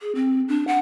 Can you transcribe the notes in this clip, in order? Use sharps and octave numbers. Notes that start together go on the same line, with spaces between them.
G#4
C4
D4
F#5